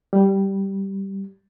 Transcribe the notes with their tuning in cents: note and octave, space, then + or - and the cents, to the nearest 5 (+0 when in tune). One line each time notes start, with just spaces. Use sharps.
G3 -10